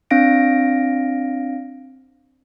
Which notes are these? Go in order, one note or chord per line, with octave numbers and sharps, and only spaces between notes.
C4 D4 F5 A#6 D7